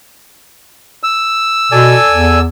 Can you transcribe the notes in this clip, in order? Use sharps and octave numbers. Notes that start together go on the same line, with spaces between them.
E6
B2 A4 D5 G#5
E2